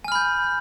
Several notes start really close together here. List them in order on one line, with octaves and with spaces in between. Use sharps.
G#5 F6 B5 G6